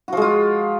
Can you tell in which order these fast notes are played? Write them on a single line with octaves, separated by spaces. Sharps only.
F#4 F3 G#3 F4